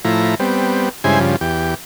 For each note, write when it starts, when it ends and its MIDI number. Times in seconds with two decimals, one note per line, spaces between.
0.05 0.35 45
0.05 0.35 53
0.05 0.35 64
0.05 0.35 82
0.40 0.89 55
0.40 0.89 59
0.40 0.89 60
1.04 1.19 43
1.04 1.19 49
1.04 1.19 56
1.04 1.19 64
1.04 1.19 72
1.04 1.19 80
1.19 1.36 43
1.19 1.36 49
1.19 1.36 53
1.41 1.75 40
1.41 1.75 67